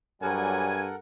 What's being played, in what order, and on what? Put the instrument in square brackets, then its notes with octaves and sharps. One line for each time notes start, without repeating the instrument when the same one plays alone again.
[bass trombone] G2 [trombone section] F#3 G3 [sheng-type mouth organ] A4 A#4 F#5 [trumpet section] G#5